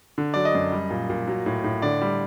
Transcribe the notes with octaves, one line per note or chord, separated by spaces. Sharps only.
D3
F#3 D5
D#5
F#2
G3
A#2
A#2
F#3
A2
A2
D3 D5
G3